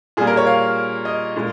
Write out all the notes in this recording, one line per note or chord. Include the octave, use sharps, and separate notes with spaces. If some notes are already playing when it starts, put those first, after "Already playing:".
A#2 G3 A#3 G#4
A#4
C#5
F5
D#5
A#2 G#3